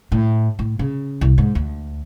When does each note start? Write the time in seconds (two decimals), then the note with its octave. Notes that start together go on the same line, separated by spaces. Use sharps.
0.12 A2
0.59 A2
0.79 C#3
1.21 C2
1.38 G#2
1.55 D2